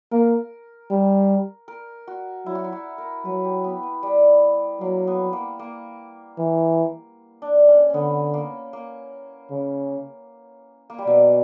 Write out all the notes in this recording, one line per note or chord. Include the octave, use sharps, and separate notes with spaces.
A#3 A#4
G3
A#4
F#4
F#3 E4
F#4
E4
F#4
A#4
F#3 B4
G4
B3
B3
G3
F#3 A#3
B3
A#3
A#3
E3
D4
C#4
D3 B3 C#4
A#3
A#3
C#3
A#3
G3
B2 F#3